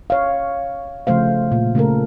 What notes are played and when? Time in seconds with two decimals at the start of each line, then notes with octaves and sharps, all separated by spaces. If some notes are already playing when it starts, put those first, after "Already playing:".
0.10 C#5 F5
1.07 C#3 F3 A3 C5 F5
1.52 A#2
1.75 C#3 A3 A4 A#4